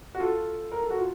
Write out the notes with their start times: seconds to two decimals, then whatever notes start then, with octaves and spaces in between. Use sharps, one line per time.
0.15 F#4
0.20 F4 A4
0.72 A#4
0.82 A4
0.90 F#4
0.99 F4